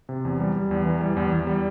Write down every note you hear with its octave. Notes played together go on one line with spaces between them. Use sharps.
C3
E2
G3
G3
E2
E3
G3
E2
E2
G3